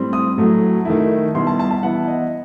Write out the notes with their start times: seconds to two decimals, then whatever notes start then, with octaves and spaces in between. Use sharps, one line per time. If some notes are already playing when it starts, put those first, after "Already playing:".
Already playing: A2 G3 C4
0.13 D#6
0.37 A2 F#3 A3
0.85 D#3 A3 E4
1.34 B2 G3 B3 E4 C6
1.47 A5
1.59 A5
1.71 A5
1.83 E3 B3 E4 F#5
2.08 D#5